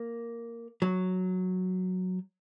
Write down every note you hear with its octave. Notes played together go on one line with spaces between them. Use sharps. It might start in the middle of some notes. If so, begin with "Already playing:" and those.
Already playing: A#3
F#3